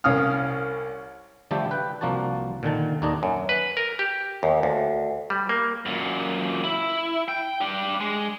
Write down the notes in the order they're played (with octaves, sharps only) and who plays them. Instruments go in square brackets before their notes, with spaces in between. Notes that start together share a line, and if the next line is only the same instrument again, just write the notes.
[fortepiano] C2 C#4 F5 D#6 F6
[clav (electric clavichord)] D3 F3 G3 A3 G4 A4
B4 G5
C2 F3 A#3 D4 F#4 A5
A#2 D3 D#3 A5
D#2 D#3 D4 D#4 D5 D#5
F#2
B4
A#4
G4
D#2
D2
G3
A#3
[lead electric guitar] F#2 A#2
E4
G5
D4 G4
G#3